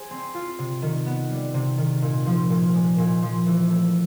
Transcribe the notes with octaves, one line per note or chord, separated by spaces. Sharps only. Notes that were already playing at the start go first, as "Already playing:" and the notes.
Already playing: G#4 C5
C4
F4
C3
D#3
B3
G3
C3
D#3
A#2
F3
A#2
G#3
A#2
F3
E3
A3